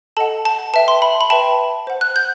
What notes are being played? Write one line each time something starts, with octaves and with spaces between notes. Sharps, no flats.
A4 D#5 F#5 A5
A5
B4 E5 G5 A5
C6
B5
B5
B4 E5 G5 A5
C5 F#5
F#6
G6